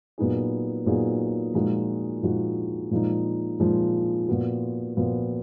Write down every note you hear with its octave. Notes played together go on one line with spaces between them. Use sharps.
A#2 F#3 B3 D#4 G#4
A#2 F#3 B3 D#4 G#4
A#2 F3 G#3 D#4 F#4
A#2 F3 G#3 D#4 F#4
A#2 F3 G#3 D#4
A#2 F3 G#3 D#4
A#2 F3 B3 F#4
A#2 F3 B3 F#4